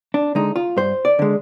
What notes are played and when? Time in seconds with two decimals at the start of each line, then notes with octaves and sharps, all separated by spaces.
0.14 D4
0.35 D3 G#3 D#4
0.56 F4
0.77 G2 C5
1.05 D5
1.19 D3 G#3